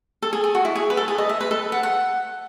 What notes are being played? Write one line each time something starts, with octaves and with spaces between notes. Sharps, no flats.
A4
G#4
G#4
F#4
E4
G#4
B4
A4
G#4
D#5
E5
B4
A4
F#5
F#5